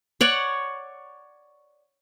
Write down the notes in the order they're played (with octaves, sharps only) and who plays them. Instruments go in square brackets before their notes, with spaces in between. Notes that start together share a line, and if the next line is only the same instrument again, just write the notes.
[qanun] C#5 D5 F#5